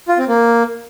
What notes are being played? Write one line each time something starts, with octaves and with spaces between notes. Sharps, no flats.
F4
C4
A#3